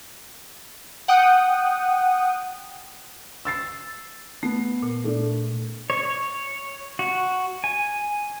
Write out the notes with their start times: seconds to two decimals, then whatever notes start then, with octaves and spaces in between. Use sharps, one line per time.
1.08 F#5 G5 D#6
3.45 E6 A6 C7
4.43 A3 B3
4.82 A#2
5.04 A3 D4
5.90 C#5
6.03 C#5
6.99 F#4
7.64 G#5